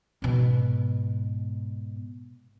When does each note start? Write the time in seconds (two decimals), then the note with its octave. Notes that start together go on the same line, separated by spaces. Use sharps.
0.22 G#2 B2